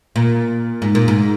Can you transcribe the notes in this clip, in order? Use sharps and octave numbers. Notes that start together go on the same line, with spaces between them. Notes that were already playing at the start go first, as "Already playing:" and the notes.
A#2
G#2
A#2
G#2